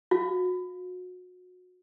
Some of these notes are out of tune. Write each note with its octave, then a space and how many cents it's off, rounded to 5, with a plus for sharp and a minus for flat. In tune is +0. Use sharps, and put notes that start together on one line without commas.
F#4 -30 F5 +0